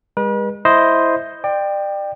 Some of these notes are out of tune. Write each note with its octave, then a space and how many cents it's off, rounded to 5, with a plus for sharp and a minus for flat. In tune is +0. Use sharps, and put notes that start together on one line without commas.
G#3 -45 B4 -40
E4 +0 C5 +0 D#5 +0
D5 +30 G5 +5